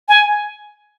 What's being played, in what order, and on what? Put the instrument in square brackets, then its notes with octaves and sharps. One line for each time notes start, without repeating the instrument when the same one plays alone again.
[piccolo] G#5